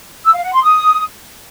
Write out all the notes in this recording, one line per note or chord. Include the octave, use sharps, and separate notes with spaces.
E6
F5
F#5
C6
D#6